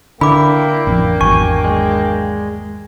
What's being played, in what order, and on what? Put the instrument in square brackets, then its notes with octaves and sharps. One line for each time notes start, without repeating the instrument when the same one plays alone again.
[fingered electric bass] D3 [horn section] A#3 D4 G5 [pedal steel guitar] E4 [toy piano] B5 D6
[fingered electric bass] A1 F2
[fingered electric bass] G#1 E2 F#3 [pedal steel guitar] G#5 [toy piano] C#6
[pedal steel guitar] G#3